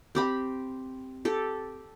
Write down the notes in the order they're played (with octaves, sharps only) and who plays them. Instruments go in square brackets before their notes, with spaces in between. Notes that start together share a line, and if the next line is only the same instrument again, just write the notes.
[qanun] C4 G4 B5
G4 A4